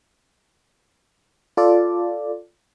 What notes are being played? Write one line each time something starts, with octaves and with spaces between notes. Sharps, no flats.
F4 A4 D5